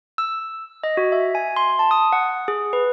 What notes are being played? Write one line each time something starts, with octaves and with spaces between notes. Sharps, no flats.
E6
D#5
F#4
E5
G#5
C6
A5
D#6
F#5
G#4
B4